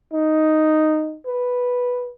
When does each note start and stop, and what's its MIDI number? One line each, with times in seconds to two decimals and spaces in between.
0.13 1.17 63
1.26 2.10 71